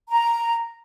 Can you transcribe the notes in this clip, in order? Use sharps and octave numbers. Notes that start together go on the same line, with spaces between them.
A#5